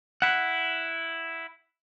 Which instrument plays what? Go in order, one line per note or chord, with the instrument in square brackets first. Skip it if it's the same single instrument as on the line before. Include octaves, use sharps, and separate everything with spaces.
[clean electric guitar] E4 F#5